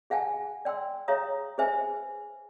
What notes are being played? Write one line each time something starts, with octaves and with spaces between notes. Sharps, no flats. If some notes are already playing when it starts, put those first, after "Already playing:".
G#4 F5 F#5 G#5 A5
D5 G5 C6 E6
G#4 C#5 E5 F5 A#5 D#6
G#4 B4 C5 E5 G#5